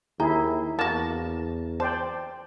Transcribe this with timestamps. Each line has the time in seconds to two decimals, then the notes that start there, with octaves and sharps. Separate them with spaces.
0.20 D#2 E4 G#4 G5 A#5
0.79 E2 A#3 F#4 A5
1.80 C5 D5 G5 A5